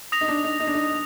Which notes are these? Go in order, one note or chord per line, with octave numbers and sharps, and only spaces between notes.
D#6 A#6 F7
D#4
D4
D#4
D#4
D4
D#4